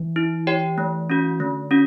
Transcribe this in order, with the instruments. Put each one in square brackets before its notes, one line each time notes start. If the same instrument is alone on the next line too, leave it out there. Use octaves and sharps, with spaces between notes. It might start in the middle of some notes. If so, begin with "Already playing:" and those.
Already playing: [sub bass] E3
[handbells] E4
G4 C#5 G5
A3
C#4 F#4
[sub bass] D3 [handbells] A3
[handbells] C#4 F#4